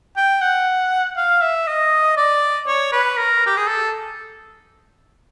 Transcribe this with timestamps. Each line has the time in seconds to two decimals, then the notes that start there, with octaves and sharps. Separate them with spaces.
0.17 G5
0.41 F#5
1.17 F5
1.42 E5
1.67 D#5
2.17 D5
2.67 C#5
2.92 B4
3.18 A#4
3.47 G4
3.57 G#4
3.68 A4